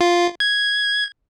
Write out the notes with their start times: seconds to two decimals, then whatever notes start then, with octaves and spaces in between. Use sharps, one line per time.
0.01 F4
0.40 G#6